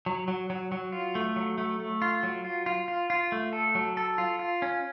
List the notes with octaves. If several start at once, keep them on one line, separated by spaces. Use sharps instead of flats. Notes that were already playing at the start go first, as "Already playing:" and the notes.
F#3
F#3
F#3
F#3
F4
A3
F#3
A3
A3
F4
F#3
F4
F4
F4
F4
A3
A4
F#3
A4
F4
F4
C#4